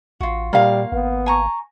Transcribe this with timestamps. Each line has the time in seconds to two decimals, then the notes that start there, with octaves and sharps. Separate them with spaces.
0.21 A1 F4 F#4
0.53 A#2 G3 A#3 F5
0.92 G#1 B3
1.26 G#5 A#5 C#6